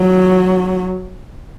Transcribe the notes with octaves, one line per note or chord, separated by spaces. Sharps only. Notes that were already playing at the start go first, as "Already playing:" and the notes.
Already playing: F#3